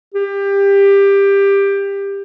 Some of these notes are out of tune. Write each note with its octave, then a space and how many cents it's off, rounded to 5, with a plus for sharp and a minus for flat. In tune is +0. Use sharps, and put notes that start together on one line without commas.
G4 +20